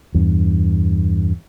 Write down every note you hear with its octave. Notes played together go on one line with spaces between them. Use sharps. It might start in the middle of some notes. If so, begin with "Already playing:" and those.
E2 G2